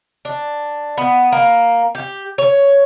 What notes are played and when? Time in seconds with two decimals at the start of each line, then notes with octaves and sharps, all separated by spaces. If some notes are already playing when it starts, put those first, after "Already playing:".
0.25 D4
0.97 B3
1.32 A#3
1.95 G4
2.38 C#5